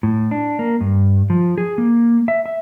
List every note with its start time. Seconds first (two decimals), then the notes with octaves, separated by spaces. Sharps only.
0.03 A2
0.31 D4
0.59 A#3
0.81 G2
1.30 F3
1.58 G#4
1.78 A#3
2.28 E5
2.46 E5